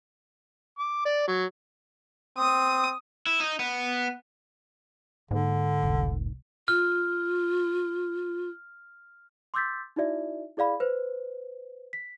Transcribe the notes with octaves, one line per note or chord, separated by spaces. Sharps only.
D6
D5
F#3
C4 D#6
E4
D#4
B3
G#2 D3 A#3
F1 C2
F4 F6
C6 D6 E6 G6 A6 B6
D#4 E4 F#4 D5 E5
E4 G#4 D5 F5 B5
B4 C5
B6